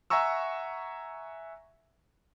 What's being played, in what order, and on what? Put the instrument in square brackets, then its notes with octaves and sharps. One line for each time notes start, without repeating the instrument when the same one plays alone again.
[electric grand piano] E5 F#5 G#5 A#5 C#6 E6